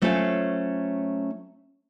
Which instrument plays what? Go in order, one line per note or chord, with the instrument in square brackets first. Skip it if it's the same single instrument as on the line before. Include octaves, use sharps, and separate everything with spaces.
[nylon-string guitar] F#3 A3 C#4 F4 C5 F5